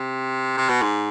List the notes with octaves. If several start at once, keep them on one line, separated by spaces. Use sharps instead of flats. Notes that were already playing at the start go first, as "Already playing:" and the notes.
Already playing: C3
C3
B2
G#2